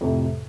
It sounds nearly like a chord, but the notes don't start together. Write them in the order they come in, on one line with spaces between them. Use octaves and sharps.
F2 C3 A2